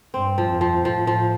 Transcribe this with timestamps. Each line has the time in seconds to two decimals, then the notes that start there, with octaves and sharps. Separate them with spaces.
0.14 G2 C4
0.38 F3
0.49 F2
0.61 F3
0.84 A2 F3
1.07 F3